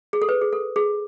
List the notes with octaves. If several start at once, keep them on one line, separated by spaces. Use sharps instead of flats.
G#4
A4
B4
G#4
A4
G#4